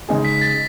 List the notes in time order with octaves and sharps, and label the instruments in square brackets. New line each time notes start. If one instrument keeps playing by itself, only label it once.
[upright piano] C#3 G#3 D#4 G#4
[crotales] B6
A6